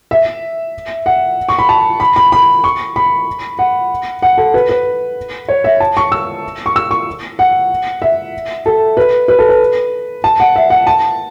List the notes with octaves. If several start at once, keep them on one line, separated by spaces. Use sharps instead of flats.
E5
F#5
C#6
B5
A5
B5
B5
B5
C#6
B5
F#5
F#5
A4
B4
B4
C#5
E5
A5
C#6
E6
C#6
E6
C#6
F#5
E5
A4
B4
B4
A4
B4
A5
F#5
E5
F#5
A5